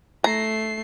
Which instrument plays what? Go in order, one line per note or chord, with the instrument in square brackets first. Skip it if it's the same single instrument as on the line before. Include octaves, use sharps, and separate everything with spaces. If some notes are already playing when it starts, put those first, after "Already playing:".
[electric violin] A3 C7 [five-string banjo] A#5